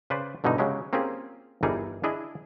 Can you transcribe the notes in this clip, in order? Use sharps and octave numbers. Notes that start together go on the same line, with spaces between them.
C#3 B4 C5 D5
G2 B2 D3 E3 D#4
C#3 F#3 G#3 G4
A#3 C4 C#4 F4 G4 G#4
G1 E3 G3 D#4 G#4 A#4
D4 E4 G#4 D#5